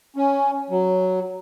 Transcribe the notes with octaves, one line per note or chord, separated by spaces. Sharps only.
C#4
F#3